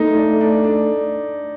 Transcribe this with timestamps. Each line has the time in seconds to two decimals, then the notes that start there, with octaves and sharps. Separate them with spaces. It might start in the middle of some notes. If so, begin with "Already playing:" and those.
Already playing: A3 D#4
0.17 D4
0.41 D4
0.64 D4